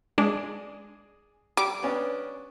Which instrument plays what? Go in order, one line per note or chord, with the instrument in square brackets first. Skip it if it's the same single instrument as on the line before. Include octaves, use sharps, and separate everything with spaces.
[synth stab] G#3 [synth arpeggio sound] D4 [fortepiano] G#4 D5 D#5
[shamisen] G3 [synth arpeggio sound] D6
[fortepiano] B3 C#4 D4